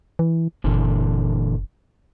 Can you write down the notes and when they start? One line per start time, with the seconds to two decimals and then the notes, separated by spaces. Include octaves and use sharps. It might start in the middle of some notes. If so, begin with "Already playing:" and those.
0.19 E3
0.64 F#1 A#2 D3 E3